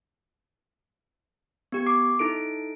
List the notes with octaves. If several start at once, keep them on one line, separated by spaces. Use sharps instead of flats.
B3 G4
D6 C7
D#4 E4 A4 D7